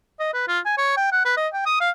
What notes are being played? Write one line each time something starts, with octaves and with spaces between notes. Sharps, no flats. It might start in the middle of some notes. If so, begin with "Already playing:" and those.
D#5
B4
F4
G#5
C#5
G5
F#5
B4
D#5
G5
D#6
F5